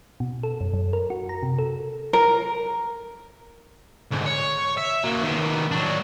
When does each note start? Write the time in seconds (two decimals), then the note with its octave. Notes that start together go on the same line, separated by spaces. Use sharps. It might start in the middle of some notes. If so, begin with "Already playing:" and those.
0.20 B2
0.43 A4
0.61 F#2
0.74 F#2
0.93 A#4
1.10 F#4
1.29 A#5
1.43 C3
1.59 A4
2.13 A#4
4.12 D2 G#2
4.26 C#5
4.77 E5
5.04 F#3 A#3
5.23 D#3 B3
5.71 F#3 D4